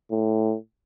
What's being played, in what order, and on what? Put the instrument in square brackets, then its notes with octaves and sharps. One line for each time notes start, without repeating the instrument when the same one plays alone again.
[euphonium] A2